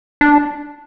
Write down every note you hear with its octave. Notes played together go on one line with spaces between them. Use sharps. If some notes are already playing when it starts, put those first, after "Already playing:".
D4